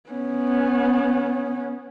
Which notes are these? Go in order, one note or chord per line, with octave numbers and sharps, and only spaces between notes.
B3 C#4